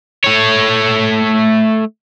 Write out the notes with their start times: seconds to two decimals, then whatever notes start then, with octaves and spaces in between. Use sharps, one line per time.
0.24 A3 C#5